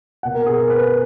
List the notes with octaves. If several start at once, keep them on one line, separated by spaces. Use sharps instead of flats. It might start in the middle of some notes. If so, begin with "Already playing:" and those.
B2 A#3 F#5
A#4
G#4
A#4
B4